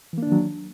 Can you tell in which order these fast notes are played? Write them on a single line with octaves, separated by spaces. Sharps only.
E3 A#3 D4 D#3 F#3